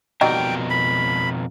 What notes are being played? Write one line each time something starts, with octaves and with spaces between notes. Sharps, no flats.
F2 B2 F#3 G3 D#4 A#4 G5
B5